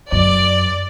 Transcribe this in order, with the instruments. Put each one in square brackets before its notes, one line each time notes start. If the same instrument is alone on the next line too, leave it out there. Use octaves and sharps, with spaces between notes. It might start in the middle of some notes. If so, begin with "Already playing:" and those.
[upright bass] F#2 [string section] D5